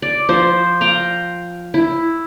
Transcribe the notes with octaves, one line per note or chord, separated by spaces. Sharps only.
D5
F3 C5
F5 G5 A#5
E4